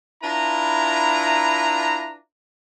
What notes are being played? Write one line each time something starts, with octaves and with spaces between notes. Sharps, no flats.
D4 E4 F4 B4 A#5